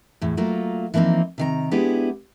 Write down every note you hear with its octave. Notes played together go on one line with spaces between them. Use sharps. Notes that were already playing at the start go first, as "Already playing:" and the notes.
E2 A2
F#3 A3 A#3 F4
E3 F3 A#3 C4 D#4
C3 D#3 A#5
G#3 B3 D4 E4 G4 G#4